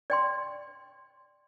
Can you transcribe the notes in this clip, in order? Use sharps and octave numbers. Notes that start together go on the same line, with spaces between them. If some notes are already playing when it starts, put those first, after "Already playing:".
D5 G5 C6